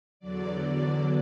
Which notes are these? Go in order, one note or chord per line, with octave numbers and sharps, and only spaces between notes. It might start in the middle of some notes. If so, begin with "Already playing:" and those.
E2 D3 F#3 D5
D5